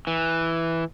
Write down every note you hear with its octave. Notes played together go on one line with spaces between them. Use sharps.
E3